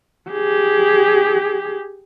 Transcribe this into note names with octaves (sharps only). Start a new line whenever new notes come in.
G4 G#4